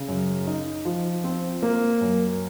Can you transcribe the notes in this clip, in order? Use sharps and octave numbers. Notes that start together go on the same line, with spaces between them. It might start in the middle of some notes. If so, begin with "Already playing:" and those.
Already playing: C#3
F#2
D#4
F3
C4
A#3
F#2